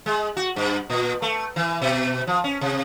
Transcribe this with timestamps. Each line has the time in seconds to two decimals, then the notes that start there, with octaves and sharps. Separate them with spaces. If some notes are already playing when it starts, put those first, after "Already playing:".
0.06 G#3
0.37 F#4
0.56 G2
0.90 A#2
1.22 A3
1.56 E3
1.81 B2
2.27 F3
2.44 C#4
2.61 C3